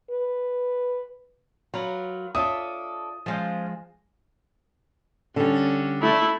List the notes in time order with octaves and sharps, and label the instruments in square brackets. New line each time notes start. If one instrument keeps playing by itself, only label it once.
[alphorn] B4
[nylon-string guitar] F#3 [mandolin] F4 A#4 B4
[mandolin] D4 A4 [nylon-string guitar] F4 C#5 E5 [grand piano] D#6
[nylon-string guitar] F3 G#3 [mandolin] C#4 F4 C5
[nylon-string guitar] D3 G3 [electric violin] C#4
[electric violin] A3 [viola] E4